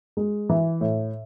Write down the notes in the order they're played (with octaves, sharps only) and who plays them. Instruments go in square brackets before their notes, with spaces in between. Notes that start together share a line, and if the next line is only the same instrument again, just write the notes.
[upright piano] G#3
E3
A2